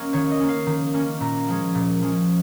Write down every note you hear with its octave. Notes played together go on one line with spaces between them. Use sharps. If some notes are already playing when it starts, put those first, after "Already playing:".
Already playing: A#3 C#4 D#5
D#3 C#5
D#5
A#3 C#4
F5
D#3
A#3 C#4
A#2 A#5
F3 G#3 C#4
A#2
F3 G#3 C#4